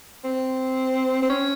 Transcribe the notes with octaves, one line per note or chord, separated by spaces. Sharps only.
C4
C4
C#4